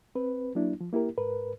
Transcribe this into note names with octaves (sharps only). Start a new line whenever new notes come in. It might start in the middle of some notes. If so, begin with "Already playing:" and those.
C4 B4
F#3 A#3 D4 E4
F3
A#3 E4 G4 A#4
G#2 A#4 B4